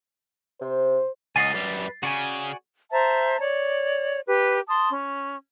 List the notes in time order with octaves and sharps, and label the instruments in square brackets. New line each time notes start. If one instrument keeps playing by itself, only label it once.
[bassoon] C3 [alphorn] C5
[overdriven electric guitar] C#2 [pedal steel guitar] D#5 F#5 G#5 [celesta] A6 C7
[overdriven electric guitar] F#2 G3 [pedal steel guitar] B4
[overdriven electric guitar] C#3 [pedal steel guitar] F#4 D5 G#5
[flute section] C5 E5 A5 A#5
C#5 D5
G4 B4
A5 C6 D#6
C#4